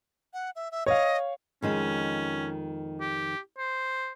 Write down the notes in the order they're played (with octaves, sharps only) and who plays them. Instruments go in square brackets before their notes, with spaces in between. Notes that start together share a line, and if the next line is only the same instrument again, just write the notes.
[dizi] F#5
E5
E5
[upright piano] C#5 F5 [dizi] D#5
[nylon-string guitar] F2 D#3 G#3 [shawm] C#4
[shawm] G4
C5